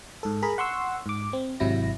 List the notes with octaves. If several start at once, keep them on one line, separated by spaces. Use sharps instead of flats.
G#2 A4
G#4 A#4 A#5 B5
F#5 C6 C#6 E6
G#2 D6
C4
G#1 C3 F#3 E4 A#6